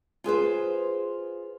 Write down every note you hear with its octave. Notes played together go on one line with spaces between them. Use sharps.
F4 G#4 B4 C5